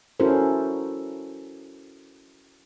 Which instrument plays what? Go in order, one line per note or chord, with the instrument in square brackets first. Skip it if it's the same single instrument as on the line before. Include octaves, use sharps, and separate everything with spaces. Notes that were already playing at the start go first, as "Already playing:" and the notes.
[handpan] C#4 E4 F#4 A4 A#4 C5